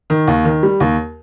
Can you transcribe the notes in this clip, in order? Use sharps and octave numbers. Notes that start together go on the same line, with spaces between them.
D#3
D#2
D#3
G3
D#2